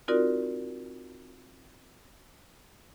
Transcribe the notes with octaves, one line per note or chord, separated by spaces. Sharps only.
C4 D#4 F4 F#4 A#4 D5